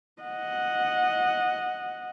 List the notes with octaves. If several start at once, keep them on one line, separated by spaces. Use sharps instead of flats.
D#5 F#5